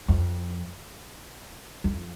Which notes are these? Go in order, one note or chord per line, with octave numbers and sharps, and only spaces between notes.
F2
F2